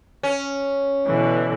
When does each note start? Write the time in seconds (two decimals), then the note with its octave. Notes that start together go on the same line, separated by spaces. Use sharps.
0.23 C#4
1.07 B2 D3 E3